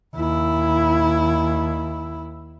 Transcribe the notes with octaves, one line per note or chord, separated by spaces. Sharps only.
D#2 E4